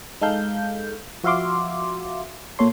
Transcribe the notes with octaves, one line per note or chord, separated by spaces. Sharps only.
G#3 D#4 A4 F5 G6
F3 F#4 E5 F5 C6 D6
A#2 A#3 A4 C#5 C6